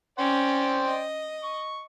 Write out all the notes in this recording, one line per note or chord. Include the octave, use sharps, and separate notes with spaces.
C#4 C5 D5 G5
D#5
C#6